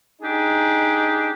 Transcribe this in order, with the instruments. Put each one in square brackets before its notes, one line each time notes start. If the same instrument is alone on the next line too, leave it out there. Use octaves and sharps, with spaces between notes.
[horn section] D4 D#4 G4 G#4